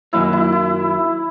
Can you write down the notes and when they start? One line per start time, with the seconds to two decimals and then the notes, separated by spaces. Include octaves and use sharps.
0.13 F#2 D#3 F#3 A#3 E4
0.33 E4
0.52 E4